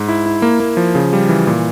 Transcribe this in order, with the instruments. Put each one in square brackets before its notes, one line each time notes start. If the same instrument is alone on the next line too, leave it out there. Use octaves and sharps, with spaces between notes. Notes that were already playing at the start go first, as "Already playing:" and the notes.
Already playing: [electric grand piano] G#2
E4
E4
A#3
A#3
F3
C#3
G3
E3
A#2